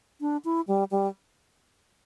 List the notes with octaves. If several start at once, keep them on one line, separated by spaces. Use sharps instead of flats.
D4
E4
G3
G3